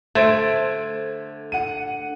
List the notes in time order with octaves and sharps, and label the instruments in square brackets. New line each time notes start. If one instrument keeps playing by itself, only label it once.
[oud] D3 C5 [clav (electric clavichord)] A3 [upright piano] G#6 D7
[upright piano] F#5 D#7